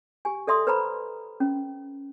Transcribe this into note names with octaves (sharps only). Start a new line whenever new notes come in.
G4 G#5
A4 D5 E5 C6 D#6
B4 C5 A#5 B5
C#4